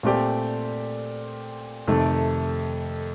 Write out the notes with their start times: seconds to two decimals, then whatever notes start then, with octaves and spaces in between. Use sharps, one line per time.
0.03 A#2 A3 C4 G4 D5
1.87 F2 C3 D#3 A3